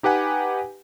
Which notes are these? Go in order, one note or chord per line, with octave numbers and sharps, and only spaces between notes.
D#4 G4 B4 F#5 G#5